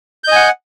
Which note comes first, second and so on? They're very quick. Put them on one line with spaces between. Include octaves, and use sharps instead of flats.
G6 D#5 G#5 F#5